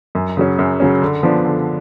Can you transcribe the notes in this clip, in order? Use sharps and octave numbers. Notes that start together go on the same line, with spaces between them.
F#2
C#3 F#3 C#4
F#2
C#3 F#3 C#4
D3
F3 B3 D4
D3